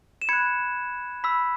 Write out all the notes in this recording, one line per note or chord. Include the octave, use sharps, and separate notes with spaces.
E7
B5 F#6 G#6 C#7
B5 E6 B6